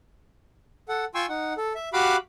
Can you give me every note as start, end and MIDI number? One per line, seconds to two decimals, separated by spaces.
0.89 1.05 69
0.89 1.05 78
1.15 1.26 65
1.15 1.26 79
1.15 1.26 80
1.15 1.26 84
1.15 1.26 85
1.15 1.26 88
1.29 1.53 63
1.29 1.53 78
1.57 1.73 69
1.75 1.89 76
1.93 2.16 66
1.93 2.16 67
1.93 2.16 77
1.93 2.16 83
1.93 2.16 86
1.93 2.16 90